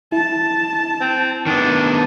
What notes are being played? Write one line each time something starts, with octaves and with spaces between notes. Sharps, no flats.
E4 A5
C4
D#3 B3 D4